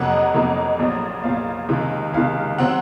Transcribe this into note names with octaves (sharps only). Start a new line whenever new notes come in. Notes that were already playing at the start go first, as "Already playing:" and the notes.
Already playing: F2 C3 F#3 A#3 D#4 F#5
D#5
F2 C3 F#3 A#3 D#4
A#1 A#2 F#3
A#1 A#2 F#3 F5
C#2 C3 D#3
C#2 C3 D#3 F5
F#3 C4 F#5